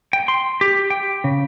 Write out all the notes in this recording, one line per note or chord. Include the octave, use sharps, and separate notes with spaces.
G5
C6
G4
G5
C#3